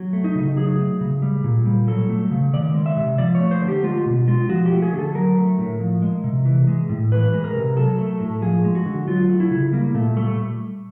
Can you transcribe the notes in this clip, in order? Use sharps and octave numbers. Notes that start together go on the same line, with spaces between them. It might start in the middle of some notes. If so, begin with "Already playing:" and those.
Already playing: F#3
A3
D#4
C#3
F#3 G#4
A3
C#3
G3
A#2
G3
F#3 A4
A3
C#3
D#3 D5
G#3
E5
C3
F3 D5
C#5
A3
C5
D3
G4
G#3 F4
B2
G#3 F4
F3 F#4
G4
A3
G#4
D3
A4
F#3 A#4
A3
A2
F3
G#3
C3
E3
G#3
A2
E3 B4
G#3
A#4
C3
F#3 A4
A3
A2
F3 G#4
G#3
F#4
D3
F#3 F4
A3
E4
C#3
G3 A#3
A#2 A3
G3 A3